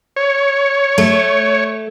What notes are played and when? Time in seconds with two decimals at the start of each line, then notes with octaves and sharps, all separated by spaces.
0.16 C#5
0.98 A3